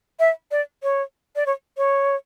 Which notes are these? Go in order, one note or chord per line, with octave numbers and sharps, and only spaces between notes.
E5
D5
C#5
D5
C#5
C#5